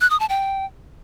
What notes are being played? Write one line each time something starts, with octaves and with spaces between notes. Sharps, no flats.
F#6
D#6
A5
G5